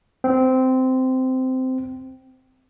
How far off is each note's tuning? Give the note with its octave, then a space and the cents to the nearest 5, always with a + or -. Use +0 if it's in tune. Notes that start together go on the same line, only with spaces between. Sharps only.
C4 -15